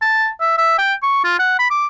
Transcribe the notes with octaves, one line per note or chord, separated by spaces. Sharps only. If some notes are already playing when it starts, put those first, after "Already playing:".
A5
E5
E5
G5
C#6
F4
F#5
B5
D6